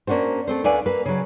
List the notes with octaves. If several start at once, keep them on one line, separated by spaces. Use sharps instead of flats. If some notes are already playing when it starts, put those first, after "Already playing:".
A#3 C#4 D4 F#4 C5
A3 C4 C5
D2 D3 B4 D5 F5 G#5
A#3 B4
C#3 F#3